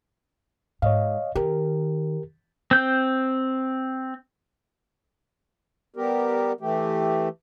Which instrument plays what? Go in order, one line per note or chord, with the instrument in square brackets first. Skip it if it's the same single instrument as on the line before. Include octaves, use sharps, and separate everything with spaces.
[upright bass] G#2 [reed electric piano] C#5 D#5 F5
[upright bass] D#3 [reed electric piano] G4 A#4
[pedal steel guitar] C4 G6
[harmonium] G3 B3 G4 A#4
E3 A3 G4